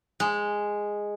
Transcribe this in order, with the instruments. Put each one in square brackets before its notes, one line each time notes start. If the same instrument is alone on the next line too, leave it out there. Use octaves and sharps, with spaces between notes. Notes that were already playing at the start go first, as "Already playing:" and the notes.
[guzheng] G#3